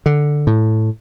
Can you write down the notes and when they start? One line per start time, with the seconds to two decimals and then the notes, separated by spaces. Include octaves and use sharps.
0.06 D3
0.47 A2